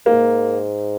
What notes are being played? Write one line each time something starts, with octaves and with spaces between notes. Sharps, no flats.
G#2 A#3